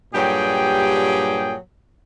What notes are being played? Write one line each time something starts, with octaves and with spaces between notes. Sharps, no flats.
G2 A#2 F#3 G4 G#4 G5